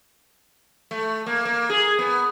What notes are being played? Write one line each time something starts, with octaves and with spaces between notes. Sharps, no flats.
A3
A#3
A#3
G#4
B3